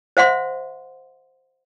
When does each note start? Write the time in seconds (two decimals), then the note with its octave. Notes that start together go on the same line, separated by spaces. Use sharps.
0.17 C5 E5 F#5 C6